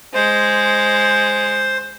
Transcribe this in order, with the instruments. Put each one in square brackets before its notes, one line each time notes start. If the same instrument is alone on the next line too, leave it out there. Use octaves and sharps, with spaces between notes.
[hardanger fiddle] G#3 [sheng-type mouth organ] C5